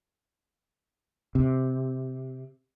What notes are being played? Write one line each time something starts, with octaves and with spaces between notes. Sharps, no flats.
C3